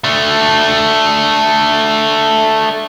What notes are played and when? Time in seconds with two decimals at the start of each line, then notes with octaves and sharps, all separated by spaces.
0.04 A3 D4